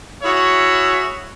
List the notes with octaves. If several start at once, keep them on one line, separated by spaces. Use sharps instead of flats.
E4 F#4 G#4 C#5 E5